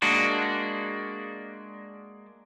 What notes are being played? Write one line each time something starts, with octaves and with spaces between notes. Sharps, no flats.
G#3 A#3 D4 F#4